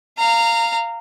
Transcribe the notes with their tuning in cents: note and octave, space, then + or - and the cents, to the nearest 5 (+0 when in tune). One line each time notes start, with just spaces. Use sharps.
F5 -10 A#5 -20